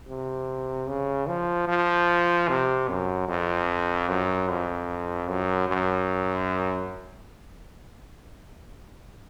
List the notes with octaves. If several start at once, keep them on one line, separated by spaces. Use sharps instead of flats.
C3
C#3
F3
F3
C3
F#2
F2
F#2
F2
F#2
F#2